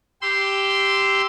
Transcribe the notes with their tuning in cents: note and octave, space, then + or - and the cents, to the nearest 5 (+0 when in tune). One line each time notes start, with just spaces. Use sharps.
G4 +0 C6 -15 E6 +0